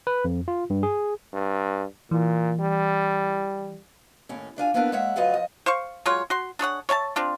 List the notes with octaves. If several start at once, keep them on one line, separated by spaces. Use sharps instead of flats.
B4
F2
F4
G2
G#4
G2
A#2 E3
G3
D#2 A2 C#4
C3 D4 F4 G#5
A#3 B3 D4 E4 A#4 B4
G#3 A#3 C#5 E5 F#5
D2 F#3 F4 B4 C#5 D#5
F3 D#5
C5 F5 C#6
F#3 G#3 F4 C#5
F#4 C6
D4 G#4 C#5 F#5
C#5 E5 G#5 A5
C4 D4 F4